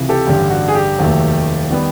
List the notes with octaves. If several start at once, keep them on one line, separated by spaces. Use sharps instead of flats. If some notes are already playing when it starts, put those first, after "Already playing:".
Already playing: C#2 C3 E3
G4 A4
A1 G2 D3 G4
F#4
G#4
G4
F1 D#2 D#3 F#3 A3
D#3 G3 B3